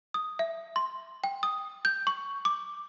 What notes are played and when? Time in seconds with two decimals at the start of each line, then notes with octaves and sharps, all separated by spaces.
0.14 D#6
0.39 E5
0.76 C6
1.24 G5
1.43 D#6
1.85 G6
2.07 C#6
2.45 D6